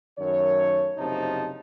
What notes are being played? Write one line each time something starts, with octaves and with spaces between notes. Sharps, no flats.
F#2 D#3 A3 C#5
F#1 C3 F3 D#4 A5